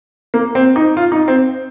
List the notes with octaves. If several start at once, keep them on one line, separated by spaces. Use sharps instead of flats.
A#3
C4
D#4
F4
D#4
C4